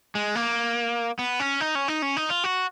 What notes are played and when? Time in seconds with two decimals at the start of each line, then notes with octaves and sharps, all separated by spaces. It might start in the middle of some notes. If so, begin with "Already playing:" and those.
0.15 G#3
0.35 A#3
1.19 B3
1.40 C#4
1.61 D#4
1.75 C#4
1.88 D#4
2.02 C#4
2.17 D#4
2.30 F4
2.44 F#4